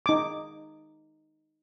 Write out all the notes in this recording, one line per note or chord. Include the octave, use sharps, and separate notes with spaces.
D#4 D6